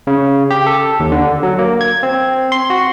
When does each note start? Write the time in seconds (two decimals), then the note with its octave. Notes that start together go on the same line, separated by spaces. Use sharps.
0.07 C#3
0.51 G4
0.67 A4
1.00 D#2
1.12 D3
1.43 F#3
1.59 A#3
1.81 G#6
2.03 C4
2.52 C6
2.70 F#4